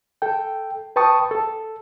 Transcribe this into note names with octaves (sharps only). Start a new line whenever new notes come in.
A4 G5
B4 G5 A5 C#6 D#6
A4